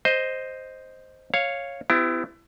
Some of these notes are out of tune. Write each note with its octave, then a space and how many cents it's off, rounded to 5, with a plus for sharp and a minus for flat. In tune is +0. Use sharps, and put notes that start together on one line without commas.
C5 +0 D#5 +0
C#5 -5 F5 +0
B3 +45 E4 +20 G4 +0